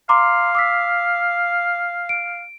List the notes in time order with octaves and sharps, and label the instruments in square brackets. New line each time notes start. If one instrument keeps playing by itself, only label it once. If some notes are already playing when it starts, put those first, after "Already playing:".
[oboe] F5 [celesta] A#5 C6 D6
[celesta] D6 E6 B6
D7